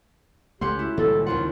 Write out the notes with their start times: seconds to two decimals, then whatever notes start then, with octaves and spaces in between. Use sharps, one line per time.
0.61 C#2 A3 C#4 G4 F#5 C6
0.79 E4 F#4
0.98 C#2 A#2 D#3 G3 A4
1.26 D#2 C4 F4 F#5